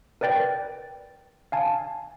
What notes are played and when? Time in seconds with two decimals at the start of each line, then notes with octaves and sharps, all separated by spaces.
0.21 A#4 B4 D5 G5 A6
1.52 F5 G#5 A5